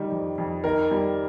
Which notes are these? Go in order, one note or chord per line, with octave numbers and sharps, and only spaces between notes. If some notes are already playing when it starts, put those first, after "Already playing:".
Already playing: D#3 G3
F2
F2
D#3 A#4
G3